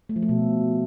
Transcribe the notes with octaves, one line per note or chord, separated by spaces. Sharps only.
A3
F3
A3
B2